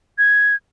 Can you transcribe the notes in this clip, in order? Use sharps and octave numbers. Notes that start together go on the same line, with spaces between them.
G#6